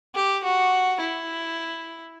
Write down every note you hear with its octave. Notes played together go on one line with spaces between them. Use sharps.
G4
F#4
E4